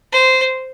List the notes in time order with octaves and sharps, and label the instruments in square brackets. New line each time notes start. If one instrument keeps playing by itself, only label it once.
[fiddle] C5